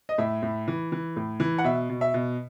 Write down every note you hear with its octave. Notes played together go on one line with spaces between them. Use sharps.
D#5
A2 E5
A2
E3
E3
A2
E3
F#5
B2 E5
B2
E5
B2